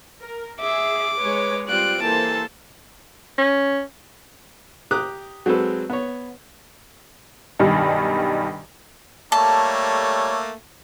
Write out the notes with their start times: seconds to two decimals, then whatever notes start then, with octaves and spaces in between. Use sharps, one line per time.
0.20 A#4
0.60 G#4 E5 D6
1.19 G#3 B4 C#5
1.69 G3 C4 F4 F#6 D7
2.02 E3 A#3 A4 C5 A5
3.38 C#4
4.91 G4 A#5 D6 D#6 F#6
5.46 F#3 G#3 C4 A4 B4
5.90 B3 C#5
7.59 B1 G2 D#3 G3
9.32 G3 A3 A#3 A4 C#5 A5